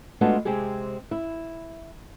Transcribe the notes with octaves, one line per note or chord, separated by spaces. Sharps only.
G#3 A3 B3 D4 F4 F#4
C3 G#3 C4 G4 G#4
E4